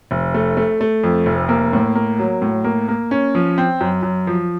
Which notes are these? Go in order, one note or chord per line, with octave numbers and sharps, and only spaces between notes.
F1
A3
A3
A3
F2
F1
A#3
A2
A#3
F#3
A2
A#3
A#3
C#4
F3
C4
F#2
F#2
F3